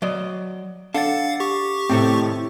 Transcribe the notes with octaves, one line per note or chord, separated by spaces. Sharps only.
F#3 D5 D#5
D4 A4 F5 F#5 A6
G4 C#6
A2 C3 D#3 C4 A4